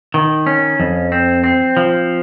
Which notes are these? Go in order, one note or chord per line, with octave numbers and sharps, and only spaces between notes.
D#3
C#4
F2
C4
C4
F3